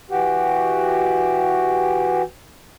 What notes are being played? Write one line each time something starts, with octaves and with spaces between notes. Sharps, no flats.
E3 F#4 G4